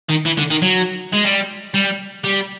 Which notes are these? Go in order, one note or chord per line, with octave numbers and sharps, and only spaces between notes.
D#3
E3
D3
D#3
F#3
G#3
G3
G3
G3